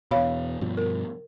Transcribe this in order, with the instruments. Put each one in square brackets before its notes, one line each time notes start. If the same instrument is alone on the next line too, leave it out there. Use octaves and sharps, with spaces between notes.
[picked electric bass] E2 B2 [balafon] C#5 F5 B5
[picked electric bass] G2 B2 F3
[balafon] A#4